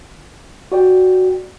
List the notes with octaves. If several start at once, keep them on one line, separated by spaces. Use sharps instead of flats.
F#4 D5 G5